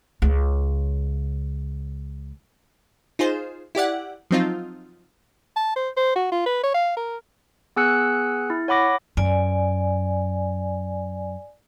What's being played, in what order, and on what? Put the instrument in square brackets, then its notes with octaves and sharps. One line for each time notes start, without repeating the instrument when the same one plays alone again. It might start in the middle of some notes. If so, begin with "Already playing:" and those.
[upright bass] C#2 C#3
[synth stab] D#4 F4 G#4 C5
E4 G4 D5 F#5
F3 F#3 C4 D#4 F4
[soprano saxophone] A5
C5
C5
F#4
F4
B4
C#5
F5
A#4
[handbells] B3 G#4 G#5 E6 F#6 C#7
E4
C#5 F#5 B5 D6 A#6
[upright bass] F#2 [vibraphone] D5 G#5